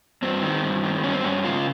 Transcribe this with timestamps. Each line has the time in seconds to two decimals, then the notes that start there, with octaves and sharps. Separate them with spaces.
0.22 G2 C4
0.42 D#3
0.63 G2
0.83 D#3
1.03 G2 C#4
1.13 C4
1.24 G2 C#4
1.44 C#3 F4